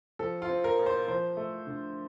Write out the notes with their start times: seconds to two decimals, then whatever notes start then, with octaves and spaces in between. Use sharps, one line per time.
0.19 F3 A4
0.42 F4
0.49 C4
0.64 A#4
0.79 A#2
0.86 C5
1.08 F3 C5
1.37 A3
1.67 D3